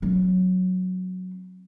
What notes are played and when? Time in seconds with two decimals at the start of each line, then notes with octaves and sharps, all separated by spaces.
0.02 F#3 C4